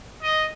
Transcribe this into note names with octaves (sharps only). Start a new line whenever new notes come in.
D#5